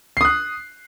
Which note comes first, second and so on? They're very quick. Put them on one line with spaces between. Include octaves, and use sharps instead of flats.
C7 D#6 F#6